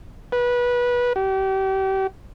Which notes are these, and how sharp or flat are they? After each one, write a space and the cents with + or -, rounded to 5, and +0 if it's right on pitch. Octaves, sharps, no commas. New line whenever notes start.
B4 -20
G4 -30